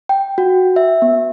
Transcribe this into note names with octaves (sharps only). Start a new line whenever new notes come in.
G5
F#4
E5
B3